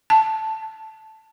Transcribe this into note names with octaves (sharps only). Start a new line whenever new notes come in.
A5